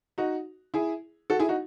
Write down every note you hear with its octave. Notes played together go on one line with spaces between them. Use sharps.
D#4 F#4
E4 G#4
F#4 A4
E4 G#4
D#4 F#4